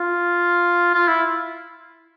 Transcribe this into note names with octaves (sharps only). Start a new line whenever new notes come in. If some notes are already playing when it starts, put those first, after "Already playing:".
Already playing: F4
F4
E4